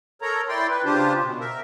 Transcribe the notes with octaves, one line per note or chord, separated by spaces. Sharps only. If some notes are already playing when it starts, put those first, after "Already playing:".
A4 A#4 C#5 A#5
E4 D5 G5 C6
B4
C#3 D4 F4 G4 C5
B2
A#4 E5